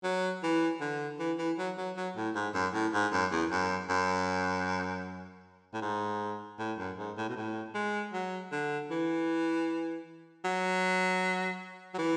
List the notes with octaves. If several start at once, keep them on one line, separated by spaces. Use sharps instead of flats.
F#3
E3
D3
E3
E3
F#3
F#3
F#3
A2
G#2
F#2
A2
G#2
F#2
E2
F#2
F#2
A2
G#2
A2
F#2
G#2
A2
B2
A2
G#3
F#3
D3
E3
F#3
F#3
E3